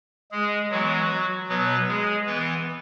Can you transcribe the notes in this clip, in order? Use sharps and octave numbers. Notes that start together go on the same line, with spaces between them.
G#3 G#4
E3 F#3 G#3 B3 F#4
B2 F#3 B3 B4
G#3 G#4
E3 B3 B4